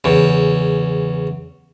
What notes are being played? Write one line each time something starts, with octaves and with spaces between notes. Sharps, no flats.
E2 C#3